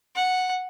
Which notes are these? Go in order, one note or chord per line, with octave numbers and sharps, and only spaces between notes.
F#5